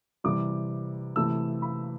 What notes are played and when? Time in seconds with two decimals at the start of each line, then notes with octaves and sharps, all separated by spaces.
0.24 C3 E3 G3 D6
1.16 C3 E3 A3 E6
1.62 B5